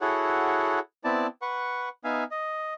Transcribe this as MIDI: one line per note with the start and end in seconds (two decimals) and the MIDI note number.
0.01 0.79 64
0.01 0.79 66
0.01 0.79 68
0.01 0.79 69
0.01 0.79 73
0.01 0.79 78
1.04 1.27 59
1.04 1.27 60
1.04 1.27 64
1.04 1.27 74
1.04 1.27 81
1.42 1.89 71
1.42 1.89 78
1.42 1.89 85
2.04 2.24 59
2.04 2.24 63
2.04 2.24 76
2.04 2.24 77
2.04 2.24 80
2.31 2.74 75